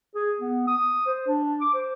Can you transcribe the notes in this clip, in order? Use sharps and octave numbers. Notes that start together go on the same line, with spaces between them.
G#4
B3
D#6
C5
D4
D6
C5